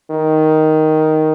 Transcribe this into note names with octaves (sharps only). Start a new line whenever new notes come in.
D#3